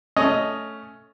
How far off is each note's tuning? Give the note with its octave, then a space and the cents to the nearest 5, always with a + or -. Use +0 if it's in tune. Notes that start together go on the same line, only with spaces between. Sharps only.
A3 +0 C#4 +10 D#5 +0